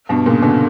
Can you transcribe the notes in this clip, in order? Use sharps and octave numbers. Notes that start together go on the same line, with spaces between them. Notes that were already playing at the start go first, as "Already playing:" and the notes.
G2 B2
A#2 C#3
B2 D3